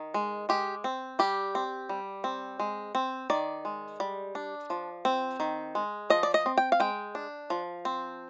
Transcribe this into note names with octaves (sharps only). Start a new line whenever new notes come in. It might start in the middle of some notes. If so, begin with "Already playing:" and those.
Already playing: D#3
G#3
G#3 G4
C4
G3 G4
C4
G3
C4
G#3
C4
D#3 D5
G#3
G3
D4
F3
C4
D#3
G#3
F3 D#5
D5
D#5
C4
G5
F5
G#3 G5
D4
F3
C4